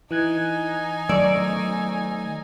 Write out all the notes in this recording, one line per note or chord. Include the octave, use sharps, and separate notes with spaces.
E3 D#4 G#5 F#6 G#6
D#3 F#3 A3 D5 C#6 E6